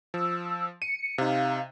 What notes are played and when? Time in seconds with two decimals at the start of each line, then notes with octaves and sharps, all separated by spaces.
0.14 F3 E6
0.82 C#7 D#7
1.18 C3 D#4 F5